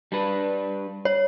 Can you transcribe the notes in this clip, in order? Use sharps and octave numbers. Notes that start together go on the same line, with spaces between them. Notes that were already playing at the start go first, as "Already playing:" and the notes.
G3 D4 B4
C#5